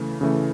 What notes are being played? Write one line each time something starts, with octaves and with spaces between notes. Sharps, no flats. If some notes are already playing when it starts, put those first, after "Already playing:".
Already playing: C#3 E3 A3
C#3 E3 A3